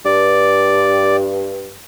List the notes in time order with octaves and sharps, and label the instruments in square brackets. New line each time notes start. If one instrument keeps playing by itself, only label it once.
[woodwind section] G2 [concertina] D5